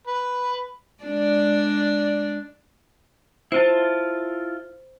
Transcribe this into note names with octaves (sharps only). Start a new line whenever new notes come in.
B4
G#3 D4 D5
E4 F4 C5 A5